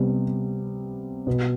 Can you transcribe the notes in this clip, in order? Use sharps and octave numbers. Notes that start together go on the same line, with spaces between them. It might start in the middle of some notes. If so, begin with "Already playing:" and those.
Already playing: C3 G3 B3
B2 B3